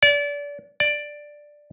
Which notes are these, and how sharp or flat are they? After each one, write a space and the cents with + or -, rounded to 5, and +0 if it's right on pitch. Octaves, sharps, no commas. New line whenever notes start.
D5 -30
D5 +5